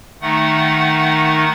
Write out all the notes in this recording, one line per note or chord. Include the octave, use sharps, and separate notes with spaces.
D#3 A3 D#4 F#5